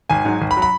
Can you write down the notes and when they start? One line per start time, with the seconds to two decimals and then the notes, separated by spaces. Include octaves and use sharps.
0.10 G#1 G#5
0.25 G#2 F#3
0.41 G#1
0.51 B5
0.57 F#3
0.62 B5